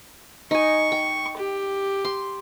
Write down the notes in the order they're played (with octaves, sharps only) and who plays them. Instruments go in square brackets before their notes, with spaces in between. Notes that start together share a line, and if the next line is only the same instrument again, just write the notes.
[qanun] D#4 G#5 [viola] C#6
[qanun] G5
[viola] G4
[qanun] C6